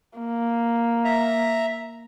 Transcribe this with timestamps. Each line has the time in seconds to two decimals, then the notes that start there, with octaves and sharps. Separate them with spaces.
0.19 A#3
1.05 E5 A#5